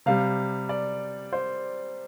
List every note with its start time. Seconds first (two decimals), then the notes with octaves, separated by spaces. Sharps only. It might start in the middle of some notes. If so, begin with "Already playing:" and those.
0.06 C3 G3 F5
0.69 D5
1.33 C5